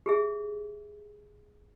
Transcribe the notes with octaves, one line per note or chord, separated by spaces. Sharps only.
G4 G#4 E5